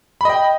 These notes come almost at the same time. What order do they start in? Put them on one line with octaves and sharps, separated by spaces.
B5 D#5 G5